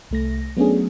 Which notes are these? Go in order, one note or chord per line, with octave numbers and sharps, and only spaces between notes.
C2 A3 A#6
F#3 A3 B3 C#4 D4 G#4